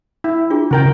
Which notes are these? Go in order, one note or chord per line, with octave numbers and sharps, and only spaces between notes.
E4
D4 F4 G#4
C#3 F#4 A#4 G5